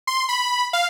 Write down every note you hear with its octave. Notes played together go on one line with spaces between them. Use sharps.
C6
B5
F5